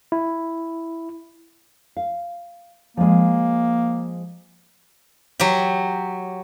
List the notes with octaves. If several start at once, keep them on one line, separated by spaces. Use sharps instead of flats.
E4
F5
F3 G#3 A#3
F#3 G4